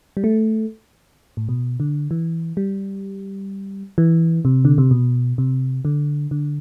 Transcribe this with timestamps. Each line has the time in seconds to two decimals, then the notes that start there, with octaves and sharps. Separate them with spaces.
0.17 G3
0.24 A3
1.37 A2
1.49 B2
1.80 D3
2.11 E3
2.57 G3
3.98 E3
4.45 C3
4.65 D3
4.78 C3
4.91 B2
5.38 C3
5.85 D3
6.31 D3